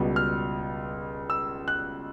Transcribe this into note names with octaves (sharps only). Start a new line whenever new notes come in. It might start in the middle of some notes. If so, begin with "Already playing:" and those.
Already playing: C#2 B2 G3
F6
E6
F#6